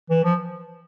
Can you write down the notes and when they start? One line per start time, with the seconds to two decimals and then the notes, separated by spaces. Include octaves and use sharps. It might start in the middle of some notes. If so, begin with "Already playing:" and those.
0.10 E3
0.24 F3